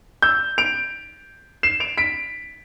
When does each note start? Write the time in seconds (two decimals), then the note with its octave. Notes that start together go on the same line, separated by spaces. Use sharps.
0.22 E6 G6
0.58 D7 F7
1.63 C7 E7
1.80 D7 F7
1.98 B6 D7